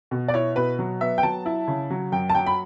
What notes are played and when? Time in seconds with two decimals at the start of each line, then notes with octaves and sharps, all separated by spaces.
0.11 B2
0.28 D5
0.34 E4 C#5
0.56 B2 B4
0.79 F#3
1.01 B3 E5
1.18 G5
1.23 F#3 A5
1.46 E4
1.68 C#3
1.90 F#3
2.12 F#2 G5
2.29 A5
2.35 F#3 G5
2.46 B5